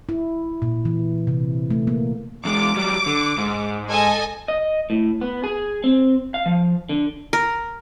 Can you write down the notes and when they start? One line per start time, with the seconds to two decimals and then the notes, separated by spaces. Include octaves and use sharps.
0.09 E4
0.62 A#2
0.85 E3
1.27 C3
1.70 A3
1.87 A#3
2.45 E2 G#3 D6
2.76 F#3 G3
3.06 D3
3.38 G#2 G#3
3.90 A4 D#5 G#5
4.48 D#5
4.90 A2
5.21 B3
5.44 G#4
5.84 C4
6.34 F5
6.46 F3
6.89 D3
7.33 A#4